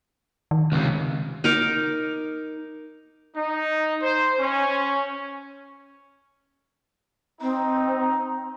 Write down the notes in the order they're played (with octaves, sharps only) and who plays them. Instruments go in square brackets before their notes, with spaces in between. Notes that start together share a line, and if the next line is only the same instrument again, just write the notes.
[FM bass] D#3
[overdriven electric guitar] C#2 C3
[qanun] D#4 A#4 D6
[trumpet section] D#4
C5
C#4
[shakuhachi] C4 [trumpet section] D#4 A#5